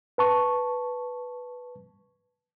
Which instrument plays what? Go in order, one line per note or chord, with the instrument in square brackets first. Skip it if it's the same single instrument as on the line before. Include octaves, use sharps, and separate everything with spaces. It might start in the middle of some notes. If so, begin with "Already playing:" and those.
[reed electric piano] B4 A5 C#6